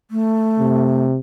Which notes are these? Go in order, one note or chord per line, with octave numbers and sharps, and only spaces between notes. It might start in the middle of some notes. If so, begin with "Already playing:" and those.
A3
C3